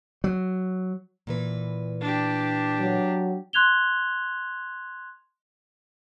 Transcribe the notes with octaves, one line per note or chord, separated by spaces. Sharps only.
F#3
A#2 E3 B4
D4 G4
F#3
C6 F#6 G#6 F7 G7